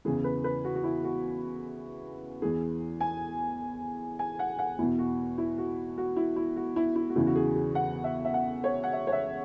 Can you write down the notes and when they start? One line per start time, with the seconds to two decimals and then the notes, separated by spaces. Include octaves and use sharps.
0.05 E2 C#3 E3 G#4
0.24 B4
0.44 B4
0.65 F#4
0.75 F#4
0.84 E4
1.04 F#4
2.42 E2 E3 G#4
3.01 G#5
4.19 G#5
4.39 F#5
4.59 F#5
4.78 E2 B2 E4
4.99 F#4
5.38 E4
5.58 F#4
5.98 F#4
6.16 E4
6.36 E4
6.57 F#4
6.76 E4
6.96 E4
7.10 F#4
7.16 E2 C#3 E3 E4
7.27 F#4
7.35 G#4
7.55 G#4
7.75 F#5
8.04 E5
8.25 E5
8.34 F#5
8.64 C#5
8.84 F#5
8.93 E5
9.07 C#5
9.12 E5